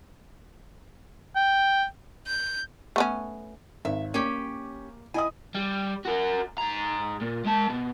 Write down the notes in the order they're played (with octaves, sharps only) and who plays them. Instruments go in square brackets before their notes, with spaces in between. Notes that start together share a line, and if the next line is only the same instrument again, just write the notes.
[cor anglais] G5
[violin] G6
[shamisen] A3 B3 C#4
[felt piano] G#1 [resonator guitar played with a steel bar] E5
[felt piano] A#3 [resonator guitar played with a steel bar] C#4 G4
[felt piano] E4 D#5 D#6 [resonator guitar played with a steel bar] G#5
[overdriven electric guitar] G3
F#4 A#4
G#2 A#5
A#2
G#3 A5
B2